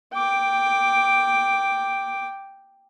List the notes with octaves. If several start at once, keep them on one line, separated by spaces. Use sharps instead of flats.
G5 D6